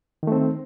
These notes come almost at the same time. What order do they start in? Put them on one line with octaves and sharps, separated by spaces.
D#3 A3 C4